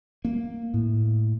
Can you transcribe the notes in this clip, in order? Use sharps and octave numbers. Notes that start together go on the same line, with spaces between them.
A#3
A2